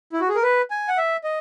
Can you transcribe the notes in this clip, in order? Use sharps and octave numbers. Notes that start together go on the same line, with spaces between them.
E4
F#4
G#4
A#4
B4
G#5
F#5
E5
D#5